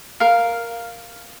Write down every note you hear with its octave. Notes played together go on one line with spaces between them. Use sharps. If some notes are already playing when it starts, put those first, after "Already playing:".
A#4 F5